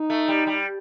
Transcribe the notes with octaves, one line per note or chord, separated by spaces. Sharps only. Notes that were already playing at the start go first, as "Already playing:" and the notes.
Already playing: D#4
A3
G3
G3